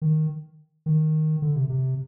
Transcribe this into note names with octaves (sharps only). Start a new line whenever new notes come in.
D#3
D#3
D3
C3
C3